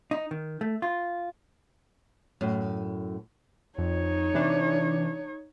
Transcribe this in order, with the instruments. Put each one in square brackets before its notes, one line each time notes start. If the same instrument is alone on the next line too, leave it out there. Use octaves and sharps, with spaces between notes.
[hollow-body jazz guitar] D#4
D#3
A3
F4
[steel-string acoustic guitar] F#2 A2
[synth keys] F2 [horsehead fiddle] D#4 C#5
[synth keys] C3 E3 D4